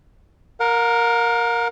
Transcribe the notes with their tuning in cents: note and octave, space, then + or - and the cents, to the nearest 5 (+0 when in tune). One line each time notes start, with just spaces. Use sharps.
A#4 +0 F5 +45